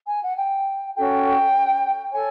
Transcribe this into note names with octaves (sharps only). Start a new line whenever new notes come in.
G#5
F#5
G5
C#4 F#4 A4 G5
A4 C#5 G#5